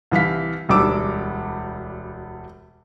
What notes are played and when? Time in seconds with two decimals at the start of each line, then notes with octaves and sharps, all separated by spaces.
0.11 C2 E3 F5 B6
0.69 E1 D2 G3 D6 E6